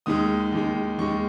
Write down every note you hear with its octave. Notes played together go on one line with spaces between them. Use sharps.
D#2 D#3 G#3 D#6
D#2 D#3 G#3
D#2 D#3 G#3 C#6